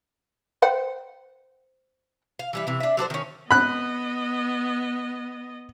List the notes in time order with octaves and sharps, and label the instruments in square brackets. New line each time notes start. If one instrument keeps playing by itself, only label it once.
[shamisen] C5 F#5 G5
[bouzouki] F5
E3 G3 E4
C3 E3
D4 E5
F#3 D4 A4 C5
D#3 C#4
[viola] B3 D#5 [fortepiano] B5 F#6